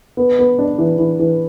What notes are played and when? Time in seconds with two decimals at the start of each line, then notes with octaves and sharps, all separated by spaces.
0.17 B3
0.39 B3
0.59 D4
0.78 E3
0.98 E3
1.19 E3